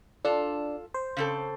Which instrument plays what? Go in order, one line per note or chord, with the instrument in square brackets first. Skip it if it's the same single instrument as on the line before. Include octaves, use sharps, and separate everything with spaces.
[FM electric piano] D4 [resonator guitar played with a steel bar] F4 A4
[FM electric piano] C5
[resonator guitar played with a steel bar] C#3 C4 A4